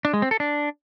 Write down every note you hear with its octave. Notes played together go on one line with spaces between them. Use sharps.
D4
G#3
C4
A4
D4